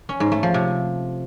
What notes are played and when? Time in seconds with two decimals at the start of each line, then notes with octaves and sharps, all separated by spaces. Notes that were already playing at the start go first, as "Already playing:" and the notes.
0.09 C#4
0.20 G#2
0.32 A3
0.43 F3
0.54 C3